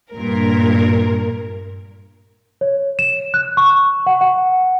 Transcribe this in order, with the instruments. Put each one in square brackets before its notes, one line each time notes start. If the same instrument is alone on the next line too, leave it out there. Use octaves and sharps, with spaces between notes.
[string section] G2 A#2 A#4
[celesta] C#5
E7
F#6
C#6
F#5
F#5